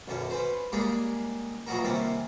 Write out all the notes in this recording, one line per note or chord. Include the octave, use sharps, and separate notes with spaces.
B1 F#2 C#4
C#4 B4 C5
C#3 G3 G#3 A#3 G4 G#4
E2 A#2 F#3 D#4 F#4 A#4
C3 D#3 G3 A#3 C4 C#4